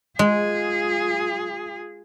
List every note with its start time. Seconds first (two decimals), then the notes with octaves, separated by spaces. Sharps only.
0.19 G#3 F4 G#4